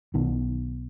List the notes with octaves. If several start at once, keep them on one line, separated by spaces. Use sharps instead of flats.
B1 B2 D#3